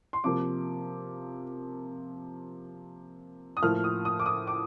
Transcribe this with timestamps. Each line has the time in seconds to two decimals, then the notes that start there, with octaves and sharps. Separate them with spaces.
0.13 C6
0.24 C3 F3 A#3 D6
3.57 D#6
3.62 A2 F3 A#3 F6
3.84 D#6
4.05 D#6
4.19 D6
4.26 D#6
4.47 D6